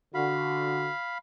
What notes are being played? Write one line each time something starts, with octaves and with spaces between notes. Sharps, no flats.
D3 F#4 F5 B5